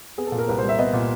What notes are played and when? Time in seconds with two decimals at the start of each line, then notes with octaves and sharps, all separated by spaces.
0.18 B3 G#4
0.27 A4
0.32 A#2
0.38 A#4
0.48 C2 B4
0.58 C5
0.63 G3
0.69 E5
0.79 B3 D#5
0.93 A#2